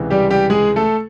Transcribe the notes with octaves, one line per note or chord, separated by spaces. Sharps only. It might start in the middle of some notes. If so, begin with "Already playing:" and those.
Already playing: C#2 C3 E3
G3 G4
G3 G4
G#3 G#4
A3 A4